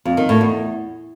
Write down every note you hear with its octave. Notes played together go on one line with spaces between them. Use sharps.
F2
D#3
A2
E2